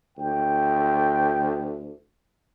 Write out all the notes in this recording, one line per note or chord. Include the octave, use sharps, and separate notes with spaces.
D2 G5